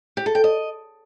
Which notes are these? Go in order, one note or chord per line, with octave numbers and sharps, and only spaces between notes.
G4
A4
G5
D#5